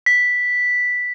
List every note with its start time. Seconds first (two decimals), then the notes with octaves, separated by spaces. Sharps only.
0.06 B6